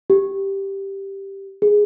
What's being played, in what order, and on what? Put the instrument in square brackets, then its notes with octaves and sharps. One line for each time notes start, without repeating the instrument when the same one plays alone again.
[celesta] G4
G#4